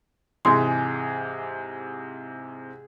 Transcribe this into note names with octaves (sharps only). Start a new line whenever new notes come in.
G#2 C3 E3 G#4 C6